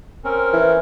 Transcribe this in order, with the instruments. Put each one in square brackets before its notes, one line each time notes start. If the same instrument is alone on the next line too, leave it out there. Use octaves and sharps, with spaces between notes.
[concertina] C4 C#4 A#4
[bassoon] E3